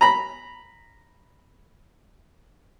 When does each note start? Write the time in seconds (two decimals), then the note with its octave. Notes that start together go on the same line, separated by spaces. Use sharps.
0.01 A#5 B5